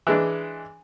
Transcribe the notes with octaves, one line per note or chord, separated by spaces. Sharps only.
E3 G#3 D4